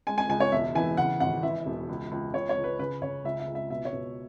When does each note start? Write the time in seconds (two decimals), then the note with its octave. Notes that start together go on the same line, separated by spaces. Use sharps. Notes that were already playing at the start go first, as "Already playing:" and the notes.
0.07 G#3 G#5
0.18 G#5
0.29 C#2 G#5
0.40 C#5
0.52 E1 E5
0.75 E3 G#5
0.97 C#3 F#5
1.20 G#1 F#5
1.43 E3 E5
1.66 E1
1.89 C#2
2.11 C#2
2.33 C#2 C#5
2.49 C#5
2.57 C#2
2.64 B4
2.79 C#3 B4
3.02 C#3 C#5
3.24 C#2 E5
3.40 E5
3.47 C#2
3.55 E5
3.70 B2 E5
3.85 C#5
3.93 B2